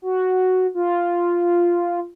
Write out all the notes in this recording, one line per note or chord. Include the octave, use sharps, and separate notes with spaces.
F#4
F4